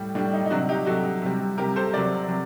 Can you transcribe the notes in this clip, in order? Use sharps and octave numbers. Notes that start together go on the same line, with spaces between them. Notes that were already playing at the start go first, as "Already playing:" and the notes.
Already playing: A2 G3
A2 G3 D4
D#4
D#4
C3 F#3 D4 F#4
D#4 G4
C3 F#3 F#4 A4
C3 G3
C3 G3 G4 A#4
A4 C5
C3 F#3 A#4 D5
C3 F#3